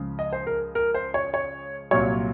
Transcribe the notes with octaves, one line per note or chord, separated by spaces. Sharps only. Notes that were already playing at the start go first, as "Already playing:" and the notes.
Already playing: C#2 C#3 F3 G#3
D#5
C5
A#4
A#4
C5
C#5
C#5
C2 A#2 F#3 C#5